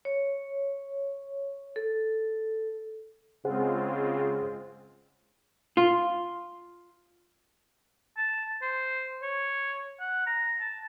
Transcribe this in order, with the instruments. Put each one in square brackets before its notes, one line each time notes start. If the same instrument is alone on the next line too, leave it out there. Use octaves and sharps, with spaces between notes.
[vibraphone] C#5
A4
[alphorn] C#3 [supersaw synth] G#3 C4 F4 [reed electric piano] G#4 C5 F#5
[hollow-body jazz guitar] F4
[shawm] A5
C5
C#5
F#5
A#5
A5